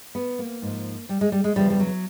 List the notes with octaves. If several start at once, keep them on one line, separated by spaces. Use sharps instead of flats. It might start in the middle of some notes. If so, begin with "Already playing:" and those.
B3
A#3
G#2 F3
G3
G#3
G3
G#3
E2 C#3 F3 G3
G3
F#3